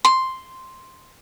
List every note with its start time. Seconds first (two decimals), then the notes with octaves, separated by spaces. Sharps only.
0.05 C6